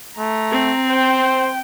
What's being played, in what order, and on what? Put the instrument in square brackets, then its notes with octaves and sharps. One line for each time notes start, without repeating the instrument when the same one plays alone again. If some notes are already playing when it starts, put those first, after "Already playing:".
[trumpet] A3 [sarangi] A#5
[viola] C4
[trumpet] C5 [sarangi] G5